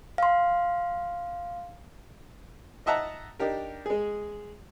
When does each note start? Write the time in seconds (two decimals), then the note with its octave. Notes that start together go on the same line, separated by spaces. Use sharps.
0.18 F5 C6
2.86 D#4 D#5 E5 F#5 A5 A#5
3.40 D4 D#4 G4 A#4
3.86 G#3 G#4